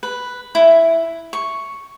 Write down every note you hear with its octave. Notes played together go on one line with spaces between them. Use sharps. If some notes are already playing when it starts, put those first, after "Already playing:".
B4
E4
C#6